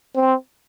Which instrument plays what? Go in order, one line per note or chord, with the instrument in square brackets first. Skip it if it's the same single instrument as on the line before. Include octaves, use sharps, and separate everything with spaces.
[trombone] C4